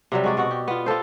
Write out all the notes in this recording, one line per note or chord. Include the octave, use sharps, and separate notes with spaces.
C3 F#3 G3
G#3 F#4 D5
B2 F#4 F#5
G4
B3 F4
F4 G4 A4 C5